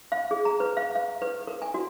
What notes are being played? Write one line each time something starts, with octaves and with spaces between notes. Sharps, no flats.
F5
G#4
A#5
B4
F5
F5
B4
A#4
G#5
F#4